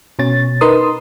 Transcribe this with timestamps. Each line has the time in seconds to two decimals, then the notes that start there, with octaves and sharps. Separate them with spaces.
0.19 B2 C#4 C#5 A6
0.61 D#4 A#4 B4 C6 D#6